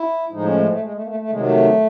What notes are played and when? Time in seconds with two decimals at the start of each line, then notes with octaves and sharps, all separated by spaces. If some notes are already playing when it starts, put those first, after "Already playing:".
Already playing: E4
0.32 A2 F3 G#3 D#4
0.45 C#4
0.57 A3
0.69 A3
0.81 G#3
0.94 A3
1.03 A#3
1.06 A3
1.20 A3
1.30 C3 D#3 F#3 G#3
1.41 A3